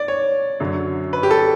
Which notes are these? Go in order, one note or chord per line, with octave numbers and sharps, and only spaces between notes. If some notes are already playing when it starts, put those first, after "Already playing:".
Already playing: D5
C#5
F#2 D3 F#3
B4
G4
A4